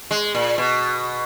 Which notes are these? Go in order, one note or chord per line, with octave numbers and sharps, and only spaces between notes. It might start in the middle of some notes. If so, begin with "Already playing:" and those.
G#3
A#2
B2